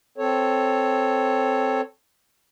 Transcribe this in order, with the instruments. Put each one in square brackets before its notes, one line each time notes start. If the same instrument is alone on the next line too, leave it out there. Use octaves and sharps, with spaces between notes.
[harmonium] C4 A4 C#5